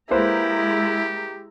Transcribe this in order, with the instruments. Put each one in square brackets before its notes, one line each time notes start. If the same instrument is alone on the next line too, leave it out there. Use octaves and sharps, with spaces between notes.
[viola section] G#3 A#5 [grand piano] A#3 B4 C5 [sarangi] E4 [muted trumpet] G4